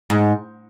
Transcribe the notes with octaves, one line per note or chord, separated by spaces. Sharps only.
G#2